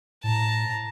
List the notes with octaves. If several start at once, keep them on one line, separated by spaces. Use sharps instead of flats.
A2 A5 A#5